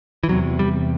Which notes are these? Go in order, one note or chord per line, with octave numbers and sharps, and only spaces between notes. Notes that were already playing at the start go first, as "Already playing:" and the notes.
E3
E2 C3 F#3
G3